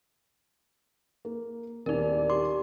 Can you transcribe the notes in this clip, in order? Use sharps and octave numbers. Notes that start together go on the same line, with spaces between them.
A#3
D#1 E2 A#3 C4 D#4 A#4 D5
G4 C6 D6